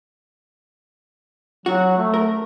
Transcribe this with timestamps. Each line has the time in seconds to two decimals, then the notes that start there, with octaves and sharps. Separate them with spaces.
1.66 F#3 F#4
1.98 A3
2.14 A#4